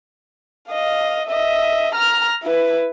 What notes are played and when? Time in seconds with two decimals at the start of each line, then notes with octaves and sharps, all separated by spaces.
0.70 D#5 F5
1.28 D#5 E5
1.95 A#5 F6
2.43 E4 B4